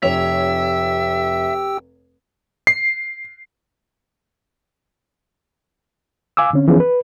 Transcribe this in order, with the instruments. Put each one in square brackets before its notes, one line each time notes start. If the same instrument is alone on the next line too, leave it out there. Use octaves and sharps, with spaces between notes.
[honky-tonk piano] F1 C#5 F7 [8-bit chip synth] G4 G5 E6 [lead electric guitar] E5
[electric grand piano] C7
[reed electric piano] F5 G#5 D6 E6
D3 C4 C#4
E3 F3 B3 C#4 G#4
B4